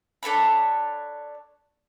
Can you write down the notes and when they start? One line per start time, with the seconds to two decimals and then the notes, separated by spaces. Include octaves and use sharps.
0.23 D4 A4 C#5 B5